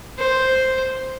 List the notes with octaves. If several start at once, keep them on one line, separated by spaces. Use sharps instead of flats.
C5